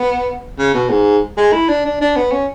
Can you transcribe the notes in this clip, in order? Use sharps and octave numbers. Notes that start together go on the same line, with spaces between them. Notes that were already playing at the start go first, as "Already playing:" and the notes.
Already playing: B3
C#3
B2
G#2
G#3
E4
D4
D4
D4
B3
C#4